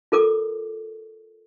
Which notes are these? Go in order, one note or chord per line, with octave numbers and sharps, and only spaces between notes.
F4 A4 A#4 D6